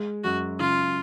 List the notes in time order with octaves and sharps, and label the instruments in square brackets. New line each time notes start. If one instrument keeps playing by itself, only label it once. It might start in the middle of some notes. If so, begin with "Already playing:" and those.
Already playing: [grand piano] G#3
[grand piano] F#2 [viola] F#4
[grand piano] C#3 [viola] F4